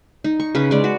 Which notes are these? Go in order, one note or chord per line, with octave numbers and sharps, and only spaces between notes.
D#4
C#6
C#3 C#4 B4
G#3 D5
F#4